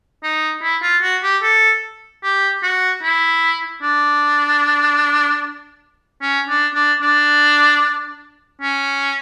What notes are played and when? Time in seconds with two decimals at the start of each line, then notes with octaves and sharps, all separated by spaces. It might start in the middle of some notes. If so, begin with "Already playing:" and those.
0.23 D#4
0.63 E4
0.83 F4
1.02 F#4
1.23 G4
1.43 A4
2.23 G4
2.63 F#4
3.03 E4
3.82 D4
6.22 C#4
6.49 D4
6.75 D4
7.02 D4
8.62 C#4